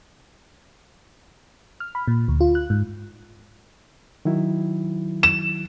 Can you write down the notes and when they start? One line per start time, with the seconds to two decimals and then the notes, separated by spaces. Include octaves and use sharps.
1.80 F6
1.95 B5
2.08 A#2
2.28 D2
2.41 F4
2.55 F#6
2.70 G#2
4.25 D#3 F#3 E4
5.23 E7